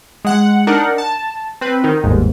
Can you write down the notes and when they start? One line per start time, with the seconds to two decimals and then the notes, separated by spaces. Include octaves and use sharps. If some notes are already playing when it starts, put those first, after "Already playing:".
0.25 G#3 F#5
0.67 D4 D#4 A#4 F#5
0.98 A5
1.61 C4 B4
1.84 D#3 D#4
2.04 G1 D#2 G#2